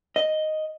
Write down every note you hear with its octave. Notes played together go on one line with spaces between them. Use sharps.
D#5